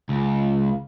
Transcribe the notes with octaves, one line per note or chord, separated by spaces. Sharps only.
C#2